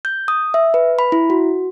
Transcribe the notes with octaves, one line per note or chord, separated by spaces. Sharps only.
G6
D#6
E5
B4
B5
E4
F#4